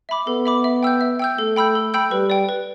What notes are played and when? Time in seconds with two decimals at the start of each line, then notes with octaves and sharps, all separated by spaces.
0.09 E5 B5 D6
0.27 B3 A4
0.46 E5 B5 D6
0.64 E5
0.83 G5 E6 G6
1.01 E5
1.19 G5 E6 G6
1.38 A3 A4
1.56 G5 B5 E6 G6
1.75 A4
1.94 G5 B5 E6 G6
2.11 G3 B4
2.30 D5 G5
2.49 B4